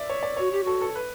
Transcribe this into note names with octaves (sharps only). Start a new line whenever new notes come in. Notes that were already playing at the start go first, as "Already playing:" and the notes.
Already playing: D5 E5
C#5
D5
F#4 C#5
G4
F#4 A4
A4
B4